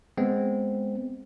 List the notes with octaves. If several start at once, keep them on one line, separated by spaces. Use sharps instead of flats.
G#3 B3 C4